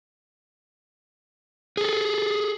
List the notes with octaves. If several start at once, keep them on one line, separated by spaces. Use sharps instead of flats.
G#4 A4